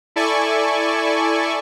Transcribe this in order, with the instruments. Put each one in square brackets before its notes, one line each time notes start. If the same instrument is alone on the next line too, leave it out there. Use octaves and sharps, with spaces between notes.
[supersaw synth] E4 A4 D5 G#5 C#6